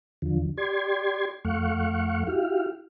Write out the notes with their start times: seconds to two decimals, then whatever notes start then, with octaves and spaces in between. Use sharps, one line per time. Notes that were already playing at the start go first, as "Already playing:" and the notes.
0.22 E2 D3 F3
0.57 G4 D5 C6 G#6
1.45 F2 A3 F5 F#5 C#6
2.27 E4 F#4 G4 F5